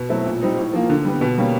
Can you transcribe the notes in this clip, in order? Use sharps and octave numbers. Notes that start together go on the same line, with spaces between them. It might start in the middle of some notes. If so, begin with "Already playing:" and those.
Already playing: B2
F#3 A3 C4 E4
A#2
G3 C4 D#4
A2
F3 A#3
D3
G3 B3
B2
G3 A#3 C#4